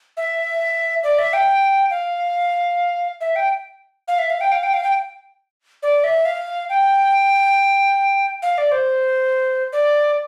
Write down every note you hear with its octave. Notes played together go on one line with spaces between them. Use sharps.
E5
D5
E5
G5
F5
E5
G5
F5
E5
F5
G5
F5
G5
F5
G5
D5
E5
F5
G5
F5
D5
C5
D5